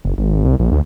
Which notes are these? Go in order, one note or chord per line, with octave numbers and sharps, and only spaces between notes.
F#1
G#1
C2
A#1
D2